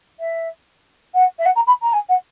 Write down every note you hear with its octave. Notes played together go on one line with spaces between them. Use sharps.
E5
F#5
E5
F#5
A#5
B5
A#5
G#5
F#5